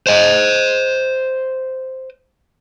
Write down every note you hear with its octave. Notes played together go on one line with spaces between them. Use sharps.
C5 D#5